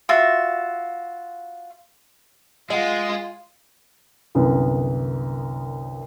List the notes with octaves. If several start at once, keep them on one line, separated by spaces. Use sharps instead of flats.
F4 F#4 E5
G#3 F4 D#5 F#5
C2 F#2 D3 B3